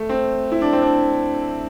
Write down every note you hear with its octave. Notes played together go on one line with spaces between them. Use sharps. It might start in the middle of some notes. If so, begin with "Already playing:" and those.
Already playing: A3
C4
E4
D4
C4
D4